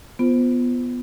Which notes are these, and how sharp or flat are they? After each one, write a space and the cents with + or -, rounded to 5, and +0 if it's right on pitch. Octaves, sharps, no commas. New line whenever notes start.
B3 +0 F4 +0 C5 -15